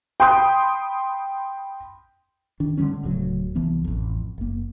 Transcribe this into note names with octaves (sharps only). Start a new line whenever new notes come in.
G5 B5 C6 D#6 G6
D#3 D4
D3 G3 G#3 C#4
D1 D2 C#3 F#3
C2 E3 F3 B3
A1 F2
F#1 A#3